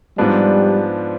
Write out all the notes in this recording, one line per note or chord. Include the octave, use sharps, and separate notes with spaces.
G#2 F3 G3 B3 D4